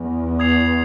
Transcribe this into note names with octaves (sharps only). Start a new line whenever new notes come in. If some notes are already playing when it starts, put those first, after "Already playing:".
Already playing: E2
D#6 G#6 C7 F7